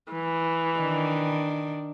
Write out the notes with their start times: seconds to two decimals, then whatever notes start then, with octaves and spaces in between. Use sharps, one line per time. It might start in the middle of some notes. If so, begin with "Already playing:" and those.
0.13 E3
0.79 D#3 D4